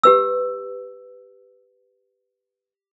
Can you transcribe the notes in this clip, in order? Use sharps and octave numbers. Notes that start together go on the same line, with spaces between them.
G4 B4 E6